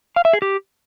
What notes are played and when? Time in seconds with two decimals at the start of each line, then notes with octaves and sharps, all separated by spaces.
0.16 F5
0.25 E5
0.33 G#4
0.42 G4